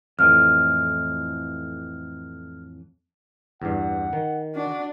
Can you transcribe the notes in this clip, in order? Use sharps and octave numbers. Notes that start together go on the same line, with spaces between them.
F2 A2 E3 F6
E2 G2 F#5
D#3
D4 F#4